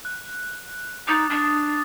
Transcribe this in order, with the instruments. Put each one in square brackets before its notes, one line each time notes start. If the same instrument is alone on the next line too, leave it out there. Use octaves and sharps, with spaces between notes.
[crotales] F#6
[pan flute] D#4 [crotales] D6 D#6 A6
[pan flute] D4